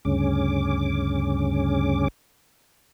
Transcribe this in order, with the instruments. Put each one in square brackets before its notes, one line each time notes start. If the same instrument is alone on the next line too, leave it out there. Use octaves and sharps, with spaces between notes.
[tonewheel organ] D2 G2 C#3 C#4 D6